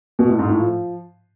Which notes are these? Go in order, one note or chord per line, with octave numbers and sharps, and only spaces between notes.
B2
A2
G#2
A2
F3